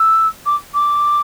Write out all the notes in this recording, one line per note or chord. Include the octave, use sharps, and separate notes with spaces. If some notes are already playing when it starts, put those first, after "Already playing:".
Already playing: E6
D6
D6